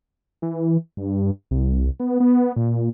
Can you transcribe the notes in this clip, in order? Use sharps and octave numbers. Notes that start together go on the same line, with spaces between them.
E3
G2
C2
B3
B3
A#2